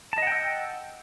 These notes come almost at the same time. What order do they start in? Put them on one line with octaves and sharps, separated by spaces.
A5 D#5 F#5 G5 E6